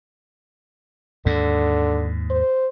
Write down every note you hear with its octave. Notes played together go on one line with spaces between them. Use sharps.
D#2 G#2 D3
C5